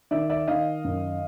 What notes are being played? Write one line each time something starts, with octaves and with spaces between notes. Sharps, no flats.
D#3 D5 E5
D5 E5
D#3 D#5 F5
F#2